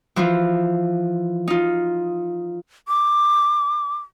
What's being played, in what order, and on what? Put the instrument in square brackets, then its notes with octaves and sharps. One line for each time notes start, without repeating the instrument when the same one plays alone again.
[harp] E3 F3 F4
D#4 F4
[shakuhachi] D6